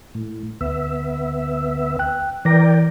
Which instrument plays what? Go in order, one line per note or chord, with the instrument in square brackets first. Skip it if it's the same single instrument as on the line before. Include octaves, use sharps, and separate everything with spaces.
[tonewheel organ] A2
D2 B3 E5
[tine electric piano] G5 F#6
[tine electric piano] E3 A#6 [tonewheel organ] A#4 D5 G5